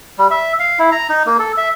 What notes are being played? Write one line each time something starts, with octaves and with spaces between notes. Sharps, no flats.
G3
E5
F5
E4
A#5
D#4
A#3
A4
E5